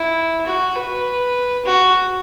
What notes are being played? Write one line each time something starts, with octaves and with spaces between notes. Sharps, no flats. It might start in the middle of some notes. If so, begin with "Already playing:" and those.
Already playing: E4
F#4
B4
F#4